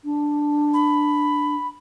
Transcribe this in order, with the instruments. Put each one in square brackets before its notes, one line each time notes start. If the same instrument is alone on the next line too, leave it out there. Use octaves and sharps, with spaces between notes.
[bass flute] D4
[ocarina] B5